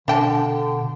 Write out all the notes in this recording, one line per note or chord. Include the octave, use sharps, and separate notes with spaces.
B2 D3 D4 G5 A5